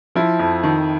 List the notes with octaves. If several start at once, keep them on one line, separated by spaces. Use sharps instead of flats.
F3 E4
F2
D#3